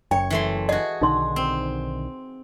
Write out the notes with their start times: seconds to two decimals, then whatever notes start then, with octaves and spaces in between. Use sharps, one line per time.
0.11 F#1 F#2 C#5 G5
0.30 E3 A3 C6
0.69 F#4 G#4 D#5
1.01 B1 D3 D#3 D#4 C6
1.36 C4